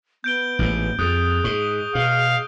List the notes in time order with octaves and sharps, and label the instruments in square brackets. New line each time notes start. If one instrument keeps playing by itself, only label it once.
[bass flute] B3 [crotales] G6 D7 G7
[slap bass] A1 G#2
[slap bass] F2 [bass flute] G#4 [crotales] D#6 F#6
[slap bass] G#2 [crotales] C#6 G7
[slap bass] B2 [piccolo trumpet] F5